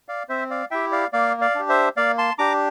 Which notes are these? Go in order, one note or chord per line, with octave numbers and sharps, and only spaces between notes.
D5 F5
C4 C5 E5
D5 F5
E4 G4 E5 G5
D5 F5
A#3 D5 F5
D5 F5
D4 G4
C5 E5
A#3 D5 F5
A5 C6
D4 G4 A#5 D6